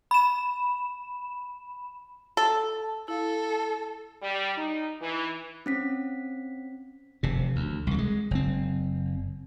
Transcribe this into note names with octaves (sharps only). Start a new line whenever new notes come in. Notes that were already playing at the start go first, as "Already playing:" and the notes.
B5 E7
A4
E4 A4 F5
G3
D#4
E3
C4 C#4 B6
F1 C3
D2
C2 D#3
G#3
F#1 C4